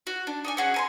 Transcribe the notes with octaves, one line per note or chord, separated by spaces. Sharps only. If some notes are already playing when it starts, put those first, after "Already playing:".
F#4
D4
D#4 D5 G#5
C#4 F#4 G#4
G#5 A#5 C6